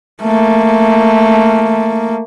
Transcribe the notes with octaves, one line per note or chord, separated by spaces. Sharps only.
A3 A#3